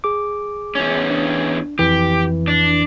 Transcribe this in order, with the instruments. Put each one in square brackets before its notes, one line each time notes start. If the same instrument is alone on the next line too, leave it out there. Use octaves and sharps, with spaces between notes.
[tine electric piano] G#4 D6
[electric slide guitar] E2 C#4
[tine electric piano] D4
[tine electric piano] F2 E3 [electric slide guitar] G4
[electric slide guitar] D4